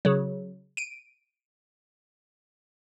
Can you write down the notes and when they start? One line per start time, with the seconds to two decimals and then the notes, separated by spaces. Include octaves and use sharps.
0.05 C#3 F#3
0.77 D7 D#7